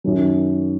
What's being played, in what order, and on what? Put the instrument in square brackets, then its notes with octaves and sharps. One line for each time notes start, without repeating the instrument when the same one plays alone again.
[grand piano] F#2 D#3 F#3